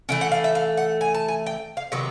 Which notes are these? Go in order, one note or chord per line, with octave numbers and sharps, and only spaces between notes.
E3 A3 C#4 G5
F#5
F5
E5
F5
F#5
G#5
A5
G#5
G5
F5
C3 D#3 F#3 B3